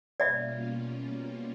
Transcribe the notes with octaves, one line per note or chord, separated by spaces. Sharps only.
B2 G3 A#3 C#4 F4 D5 E5